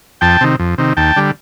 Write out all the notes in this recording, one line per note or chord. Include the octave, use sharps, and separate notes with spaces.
F2 G5 A5
C3 D#3
F2
C3 D#3
D#2 G5 A5
D3 G3